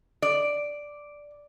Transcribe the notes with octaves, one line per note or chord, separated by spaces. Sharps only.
D5